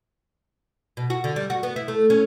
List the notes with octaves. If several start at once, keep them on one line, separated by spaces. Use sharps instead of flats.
B2
F#4
D3
G3
F#4
B3
E4
A3
C#4